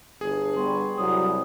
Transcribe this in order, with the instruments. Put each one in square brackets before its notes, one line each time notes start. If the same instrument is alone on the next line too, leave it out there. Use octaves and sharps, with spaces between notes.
[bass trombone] G1 [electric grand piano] G#4
[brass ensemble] G3 B3 [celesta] C6 C#6
[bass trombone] C2 [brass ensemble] F#3 [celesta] D#6